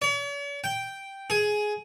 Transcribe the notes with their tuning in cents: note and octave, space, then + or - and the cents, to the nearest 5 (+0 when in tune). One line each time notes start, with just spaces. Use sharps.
C#5 +45
G5 -5
G#4 +10